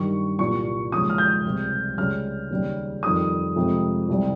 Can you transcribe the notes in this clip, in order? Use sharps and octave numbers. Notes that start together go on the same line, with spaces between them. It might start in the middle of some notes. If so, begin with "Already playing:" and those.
Already playing: G2 D#3 G3 C#6
C2 A#2 G3 C#6
D#2 C#3 F3 G#3 D#6
F6
G6
C#2 C3 G3
C#2 C#3 G3 F6
D#2 C#3 G3
F2 D#3 G3 D#6
F2 C3 F3 G#3
C2 C3 G3